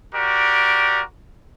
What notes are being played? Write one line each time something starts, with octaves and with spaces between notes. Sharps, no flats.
F#4 G4 A#4 D5